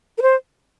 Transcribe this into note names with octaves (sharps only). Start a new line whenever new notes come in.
A#4
C5